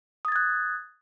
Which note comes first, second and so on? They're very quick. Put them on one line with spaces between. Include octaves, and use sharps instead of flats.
D#6 A6 G#6 F#6